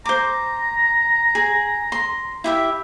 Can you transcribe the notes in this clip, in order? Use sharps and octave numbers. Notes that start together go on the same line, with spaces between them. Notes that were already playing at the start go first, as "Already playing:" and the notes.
C5 A#5 D6
G#4
C6
E4 G4 E5